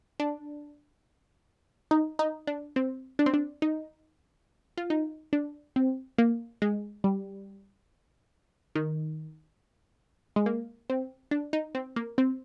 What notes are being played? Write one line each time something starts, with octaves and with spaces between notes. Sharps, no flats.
D4
D#4
D#4
D4
C4
D4
C4
D4
D#4
F4
D#4
D4
C4
A#3
G#3
G3
D#3
G#3
A#3
C4
D4
D#4
C4
A#3
C4